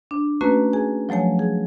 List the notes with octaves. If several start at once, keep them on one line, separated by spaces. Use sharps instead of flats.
D4
A3 A#3 C#4 F#4 B4
G#4 G#5
F3 F#3 A3 C#5 G#5
G#4